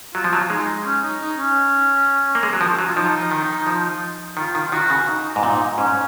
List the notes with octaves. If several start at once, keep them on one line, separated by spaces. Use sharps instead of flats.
F#3 F4
F3
F#3
G#3 D#4
C#4
D#4
D#4
C#4
A#3
G#3
F#3
F3
F#3
F4
F3 D#4
D#3
F3
D#3 F4
D#3
F4
D#3 F#4
C#3
D#4
G#2
A#2 D#4
G#2 C#4